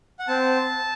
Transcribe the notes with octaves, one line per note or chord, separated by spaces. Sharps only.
F#5
C4 A5